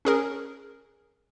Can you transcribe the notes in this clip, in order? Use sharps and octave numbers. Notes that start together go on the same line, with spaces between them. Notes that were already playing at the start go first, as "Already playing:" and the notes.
C#4 G#4 A#4